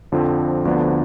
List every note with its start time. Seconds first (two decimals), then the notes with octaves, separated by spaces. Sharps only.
0.12 F2 D3 F3 C4
0.65 D2 D3 F3 B3 D4